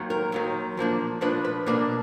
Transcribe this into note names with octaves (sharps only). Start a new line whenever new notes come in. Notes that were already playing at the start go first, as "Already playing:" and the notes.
Already playing: D#2 D#3 F#3
A#4
D#2 D#3 F#3
A#2 F3 A#3 D4
A#2 F3 A#3 D4 B4
B4
B2 A#3 D4 D5